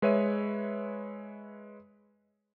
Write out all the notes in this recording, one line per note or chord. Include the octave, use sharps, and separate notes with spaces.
G#3 B4 C#5 E5 D#7